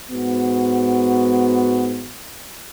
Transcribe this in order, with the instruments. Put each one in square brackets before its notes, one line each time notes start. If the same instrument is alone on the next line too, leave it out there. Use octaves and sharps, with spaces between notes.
[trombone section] G#2 B3 F#4